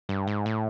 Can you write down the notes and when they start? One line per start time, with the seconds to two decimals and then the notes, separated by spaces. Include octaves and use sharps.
0.09 G2
0.27 G#2
0.46 A2